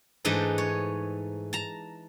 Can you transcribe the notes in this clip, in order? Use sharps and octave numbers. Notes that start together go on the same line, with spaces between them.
G#2 E3 A3 D4 D#4 C5
C#5
A5 A#5